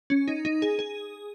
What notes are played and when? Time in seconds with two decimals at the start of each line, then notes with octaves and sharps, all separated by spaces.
0.10 C#4
0.28 D#4
0.45 D#4
0.62 G#4
0.79 G#4